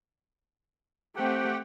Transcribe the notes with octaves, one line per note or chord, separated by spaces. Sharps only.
A3 C4 G4 F#5 G5